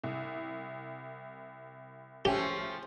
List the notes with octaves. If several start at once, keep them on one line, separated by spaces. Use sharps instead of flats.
C2
F3 A3 C#4 G4